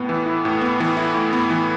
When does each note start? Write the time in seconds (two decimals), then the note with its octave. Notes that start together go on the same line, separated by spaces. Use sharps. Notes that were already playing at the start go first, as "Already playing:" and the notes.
Already playing: A2 B3
0.09 E3
0.26 E4
0.45 A2
0.61 B3
0.80 E3
0.97 E4
1.14 A2
1.33 B3
1.50 E3